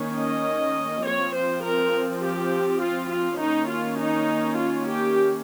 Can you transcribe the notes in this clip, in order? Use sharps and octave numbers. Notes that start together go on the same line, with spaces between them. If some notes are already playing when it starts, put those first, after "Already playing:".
Already playing: D#3 A#3 C#4
D#5
F3 C4 C#5
C5
A#4
G4
F4
F4
D#3 A#3 C#4 D#4
F4
D#4
F4
G4